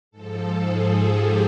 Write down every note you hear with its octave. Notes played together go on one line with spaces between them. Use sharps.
G#2 F3 A4
G#4
G4